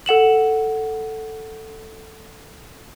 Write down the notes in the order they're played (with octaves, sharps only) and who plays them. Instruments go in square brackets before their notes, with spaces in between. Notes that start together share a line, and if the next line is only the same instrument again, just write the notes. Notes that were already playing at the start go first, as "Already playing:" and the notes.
[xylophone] A4 F#5 E7 F#7